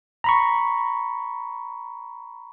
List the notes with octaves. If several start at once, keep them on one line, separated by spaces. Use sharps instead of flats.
A#5 B5 C#6